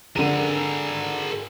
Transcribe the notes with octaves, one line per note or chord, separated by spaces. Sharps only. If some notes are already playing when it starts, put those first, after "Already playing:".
D3 G#4 A#4 D#7